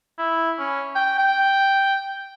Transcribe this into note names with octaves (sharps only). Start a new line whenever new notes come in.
E4
C#4
G5
G5